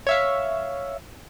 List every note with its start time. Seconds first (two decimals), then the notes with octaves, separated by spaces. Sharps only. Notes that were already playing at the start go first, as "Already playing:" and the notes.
0.07 C#5 E5 F5